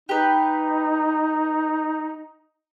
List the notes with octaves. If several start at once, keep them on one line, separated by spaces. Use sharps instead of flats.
D#4 G4 B4